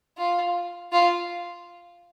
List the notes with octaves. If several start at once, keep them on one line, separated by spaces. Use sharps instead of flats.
F4
F4